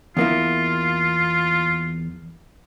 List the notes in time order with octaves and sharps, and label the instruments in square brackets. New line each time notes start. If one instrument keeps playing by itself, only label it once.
[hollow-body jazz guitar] E2 A#3 E4 [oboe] F4